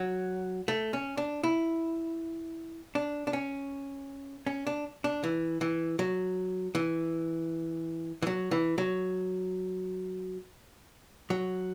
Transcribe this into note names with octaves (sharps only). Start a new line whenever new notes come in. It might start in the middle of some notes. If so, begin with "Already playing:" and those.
Already playing: F#3
A3
C#4
D4
E4
D4
D4
C#4
C#4
D4
D4
E3
E3
F#3
E3
E3
F#3
E3
F#3
F#3